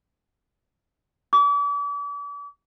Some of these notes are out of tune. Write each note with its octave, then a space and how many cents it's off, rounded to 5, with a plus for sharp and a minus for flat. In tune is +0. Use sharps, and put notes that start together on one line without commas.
D6 -40